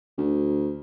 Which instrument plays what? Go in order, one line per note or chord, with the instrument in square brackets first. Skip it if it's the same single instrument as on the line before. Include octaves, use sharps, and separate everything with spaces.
[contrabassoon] D2